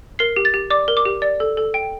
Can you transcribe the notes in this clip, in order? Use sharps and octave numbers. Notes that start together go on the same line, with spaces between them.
A#4 C7
G4
A6
G4
D5 D6
A#4
D6
G4
D5
A4
A4
G5